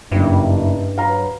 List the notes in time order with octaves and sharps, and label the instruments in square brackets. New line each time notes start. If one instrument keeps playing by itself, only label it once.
[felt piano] F#1 [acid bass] G2 [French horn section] A3 D4 D#4
[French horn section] F#3 B4 [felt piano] F5 A#5